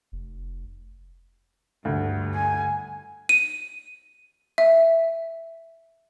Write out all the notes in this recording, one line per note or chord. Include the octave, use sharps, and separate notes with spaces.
F1
D2 G2
G#5
D#7
E5